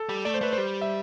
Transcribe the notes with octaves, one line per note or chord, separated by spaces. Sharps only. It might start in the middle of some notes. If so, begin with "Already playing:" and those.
Already playing: A4
G3
A3 D5
C5
A3 B4
G3 C5
E5